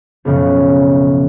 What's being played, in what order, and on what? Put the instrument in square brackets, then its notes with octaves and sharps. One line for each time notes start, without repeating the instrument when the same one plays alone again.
[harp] B1 F#2 C#3 F3